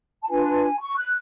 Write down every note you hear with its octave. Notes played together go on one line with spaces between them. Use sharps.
A5
D4 F4 B4 G#5
C#6
F#6